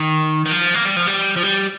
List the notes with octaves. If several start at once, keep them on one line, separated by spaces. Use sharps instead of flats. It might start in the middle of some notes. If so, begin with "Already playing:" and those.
Already playing: D#3
D#3
F3
A#3
G3
F3
G3
F3
G3